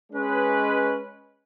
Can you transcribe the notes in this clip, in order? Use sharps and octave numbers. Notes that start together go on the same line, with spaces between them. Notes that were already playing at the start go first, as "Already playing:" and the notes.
G#3 C#4 B4